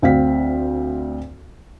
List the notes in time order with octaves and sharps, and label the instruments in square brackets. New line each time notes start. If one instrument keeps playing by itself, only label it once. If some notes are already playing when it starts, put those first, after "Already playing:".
[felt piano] D2 C4 F5 B6